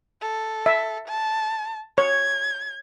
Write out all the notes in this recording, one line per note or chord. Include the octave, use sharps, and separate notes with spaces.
A4
E5
A5
C#5 G#6